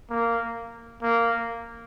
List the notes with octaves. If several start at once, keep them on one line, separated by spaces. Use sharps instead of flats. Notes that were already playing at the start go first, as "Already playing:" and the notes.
A#3
A#3